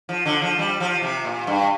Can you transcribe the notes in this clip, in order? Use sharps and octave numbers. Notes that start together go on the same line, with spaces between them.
F3
D3
F3
G3
F3
C3
A#2
G2